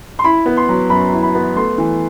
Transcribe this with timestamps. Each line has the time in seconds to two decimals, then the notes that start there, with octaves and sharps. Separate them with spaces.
0.19 C6
0.24 E4 B5
0.46 B3
0.57 C6
0.69 F#3
0.90 F#2 B5
1.12 E4
1.23 B5
1.35 B3
1.56 A3 C6
1.78 E3